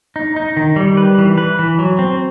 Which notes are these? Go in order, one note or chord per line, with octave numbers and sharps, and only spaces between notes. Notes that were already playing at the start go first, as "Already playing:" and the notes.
D#4
D#4
D#3
G3
B4
E3
B4
E3
F#3
C4